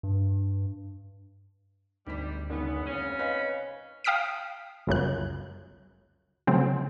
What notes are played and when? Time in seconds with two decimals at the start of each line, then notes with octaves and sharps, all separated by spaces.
0.03 G2
2.07 G#1 D2 G3 B6
2.50 F#1 G#2 D#3 B3
2.86 C#3 C4 C#4
3.19 B4 D#5 F5 G#5
4.04 F5 G5 D#6 F6 B6 D7
4.87 G1 C#2 F#2 F#6
6.47 C#3 F#3 A3 C4